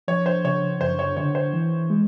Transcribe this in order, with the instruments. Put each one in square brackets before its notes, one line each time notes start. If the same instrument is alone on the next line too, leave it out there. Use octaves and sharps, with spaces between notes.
[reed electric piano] F3 [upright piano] C#5
[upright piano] C5
[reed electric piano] C#3 [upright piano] C#5
[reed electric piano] F#2 [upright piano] C5
[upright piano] C#5
[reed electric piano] D3 [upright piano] C#5
[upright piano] C5
[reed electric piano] E3
G#3